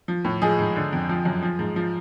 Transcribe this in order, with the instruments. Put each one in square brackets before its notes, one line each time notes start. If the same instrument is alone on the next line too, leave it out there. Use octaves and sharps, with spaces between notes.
[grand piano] F3
A2
F3 G#3 G#4
G#2
D3
F2
F3
F#2
F3
G#2
F3